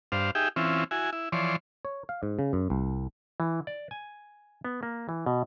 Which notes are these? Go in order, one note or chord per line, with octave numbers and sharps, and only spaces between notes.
G2 D4 C5 F5
D#4 G4 G#4 E5 G5
E3 C4 C#4 E4 F4
E4 F#4 G#5
E4
E3 F3 C#5 D5 C6
C#5
F5
G#2
C#3
F#2
C2
E3
D5
G#5
B3
A#3
E3
B2